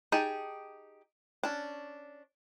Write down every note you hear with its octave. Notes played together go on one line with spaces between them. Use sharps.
D#4 G4 G#4 A5
C#4 D4